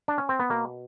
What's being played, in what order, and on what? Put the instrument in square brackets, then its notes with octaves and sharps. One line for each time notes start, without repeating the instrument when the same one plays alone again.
[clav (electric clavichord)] D4
C#4
C4
B3
B2 A#3